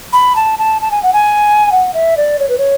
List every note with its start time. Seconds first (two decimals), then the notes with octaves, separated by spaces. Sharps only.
0.13 B5
0.36 A5
0.59 A5
0.82 A5
0.91 G#5
1.03 F#5
1.13 G#5
1.72 F#5
1.94 E5
2.17 D5
2.39 C#5
2.49 B4
2.58 C#5